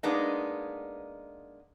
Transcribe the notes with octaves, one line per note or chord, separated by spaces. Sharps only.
G#3 A#3 B3 D4 D#4